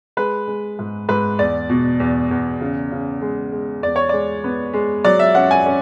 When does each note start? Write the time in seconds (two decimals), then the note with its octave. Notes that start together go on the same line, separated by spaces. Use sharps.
0.17 G#3 B4
0.48 G#3
0.79 G#2
1.09 G#2 B4
1.39 E2 D5
1.69 B2
2.00 E2
2.31 E2
2.61 C#3
2.92 C#3
3.22 G#3
3.52 G#3
3.83 E2 D5
3.96 C#5
4.09 G#3 D5
4.44 B3
4.73 G#3
5.04 F#3 D5
5.19 E5
5.35 C#4 F#5
5.51 G#5
5.66 C#4